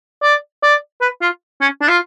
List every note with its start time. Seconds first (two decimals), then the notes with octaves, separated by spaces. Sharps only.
0.23 D5
0.63 D5
1.01 B4
1.22 F4
1.61 C#4
1.81 D4
1.89 F4